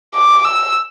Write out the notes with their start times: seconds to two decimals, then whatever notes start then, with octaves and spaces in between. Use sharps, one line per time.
0.14 D6
0.44 E6